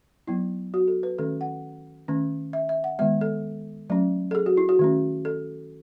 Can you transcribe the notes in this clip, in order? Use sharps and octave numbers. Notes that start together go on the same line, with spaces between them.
F#3 B3 E4
F#4
A4
B4
D#3 A3 C#4 A4
F#5
D#3 A3 C#4
E5
E5
F#5
D#3 G#3 B3 E5
A4
F#3 A3 C#4
A4
G#4
F#4
E4
F#4
D#3 A3 C#4
A4